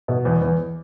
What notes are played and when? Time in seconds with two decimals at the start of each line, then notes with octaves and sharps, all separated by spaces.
0.08 B2
0.25 E2
0.42 E2